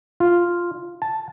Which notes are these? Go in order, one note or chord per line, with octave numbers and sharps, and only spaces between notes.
F4
A5